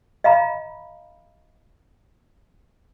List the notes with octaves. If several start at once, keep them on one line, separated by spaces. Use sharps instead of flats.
D#5 F5 A#5 B5